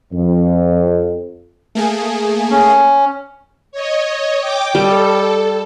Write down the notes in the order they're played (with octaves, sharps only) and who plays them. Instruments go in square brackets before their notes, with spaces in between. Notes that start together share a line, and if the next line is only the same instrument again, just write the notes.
[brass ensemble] F2
[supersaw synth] A3 A#3 G#4
[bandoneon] C#4
[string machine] C#5 D#5
G5 D6
[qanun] G3 [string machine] A4